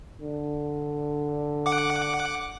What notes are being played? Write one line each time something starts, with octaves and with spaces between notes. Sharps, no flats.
D3
F#5 D6